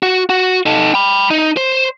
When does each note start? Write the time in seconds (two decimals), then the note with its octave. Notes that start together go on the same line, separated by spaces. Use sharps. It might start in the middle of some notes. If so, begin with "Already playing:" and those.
0.03 F#4
0.29 F#4
0.66 D#4 A4
0.94 G5 B5
1.31 D#4
1.57 C5